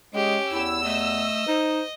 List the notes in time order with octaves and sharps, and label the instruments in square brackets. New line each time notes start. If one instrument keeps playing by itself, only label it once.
[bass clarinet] G#3 [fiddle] C#4 G4 [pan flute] G#4
[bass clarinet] E2 [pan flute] E4 [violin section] E6
[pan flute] A3 [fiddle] D#5
[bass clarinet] D#4 [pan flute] C5